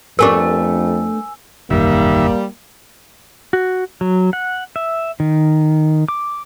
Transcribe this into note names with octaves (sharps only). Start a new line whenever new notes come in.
F2 A3 B3 D4 G4 A#4 G#5 E6
E1 A1 F#2 D#3 G3 A#3 E5
F#4
F#3
F#5
E5
D#3
D6